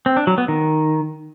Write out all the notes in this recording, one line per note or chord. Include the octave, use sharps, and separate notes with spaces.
C4
D4
F#3
B3
D#3